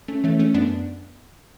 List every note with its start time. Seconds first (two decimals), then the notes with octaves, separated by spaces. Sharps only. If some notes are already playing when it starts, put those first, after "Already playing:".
0.08 A3 C#4
0.24 E3 A3 C#4
0.39 A3 C#4
0.54 F#2 B3 D4